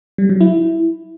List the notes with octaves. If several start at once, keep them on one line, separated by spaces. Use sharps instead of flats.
G3
F#3
E4